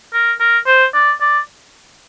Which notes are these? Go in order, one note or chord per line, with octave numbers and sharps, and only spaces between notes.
A#4
A#4
C5
D5
D5